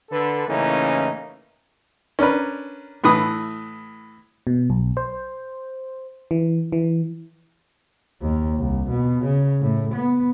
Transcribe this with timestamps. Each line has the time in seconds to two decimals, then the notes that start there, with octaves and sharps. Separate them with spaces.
0.11 D3 A4 B4
0.48 A2 C#3 E3 A#3 C#4 D#4
2.19 C#4 D4 A#4 B4
3.04 A2 E3 B4 D#6
4.47 B2
4.70 B1
4.97 C5
6.31 E3
6.72 E3
8.21 D#2
8.58 C2
8.90 B2
9.24 C#3
9.60 A2
9.95 B3